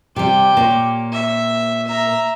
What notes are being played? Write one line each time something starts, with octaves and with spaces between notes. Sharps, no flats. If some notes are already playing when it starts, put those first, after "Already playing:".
C3 G3 G4 G5
A#2 A#3 C#5
E5
E5 A#5